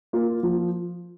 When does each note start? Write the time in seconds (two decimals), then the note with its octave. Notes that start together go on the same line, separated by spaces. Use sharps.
0.13 A#3 F4
0.43 F3